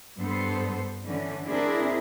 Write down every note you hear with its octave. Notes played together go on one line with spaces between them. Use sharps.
G2 B3 A4 C5
D3 E3 C#4
C4 D4 E4 G#4 A#4